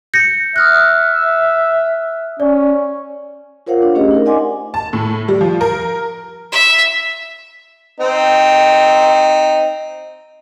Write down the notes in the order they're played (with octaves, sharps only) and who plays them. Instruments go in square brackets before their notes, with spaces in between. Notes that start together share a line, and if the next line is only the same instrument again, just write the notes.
[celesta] G6 A#6 C#7
[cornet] E5 [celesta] D#6 F6 F#6
[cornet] C#4 [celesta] D5
[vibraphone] F4 A#4 C5 C#5 F5 F#5
D4
A3 C#4 G4 G#4 C5 D#5
D#4 A#4
D5 D#5 F#5 G#5 C6 D6
[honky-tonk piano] A5
A2
G3
F3
A#4
[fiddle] E5
[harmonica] C4 D#4